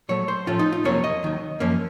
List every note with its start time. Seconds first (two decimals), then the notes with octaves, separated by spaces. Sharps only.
0.09 A#2 F#3 A3 C#5
0.28 C5
0.47 A2 F3 A3 C#4 F4
0.59 D#4
0.72 F4
0.84 F2 C3 F#3 A#3 C#4 C#5
1.04 D#5
1.23 D#2 D#3 F#3
1.60 F#2 F3 A#3 C#4